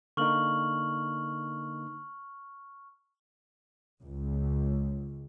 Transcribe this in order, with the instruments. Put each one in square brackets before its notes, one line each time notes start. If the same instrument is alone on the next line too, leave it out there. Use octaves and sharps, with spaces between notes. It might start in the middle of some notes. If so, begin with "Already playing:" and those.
[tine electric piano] D3 A#3 D#4 [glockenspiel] C#6 F6 F#7
[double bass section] C#2